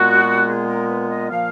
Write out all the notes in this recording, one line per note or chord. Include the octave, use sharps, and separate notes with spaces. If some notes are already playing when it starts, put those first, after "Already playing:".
Already playing: A#2 G#3 B3 F#4
G#4
A#4
B4
D#5
A#2 F3 A#3 F5